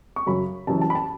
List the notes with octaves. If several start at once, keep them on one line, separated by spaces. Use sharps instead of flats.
C#6
F#2 C#3 F#3 B5
F#1 F#2 E3 G3 A5
A5
B5
A5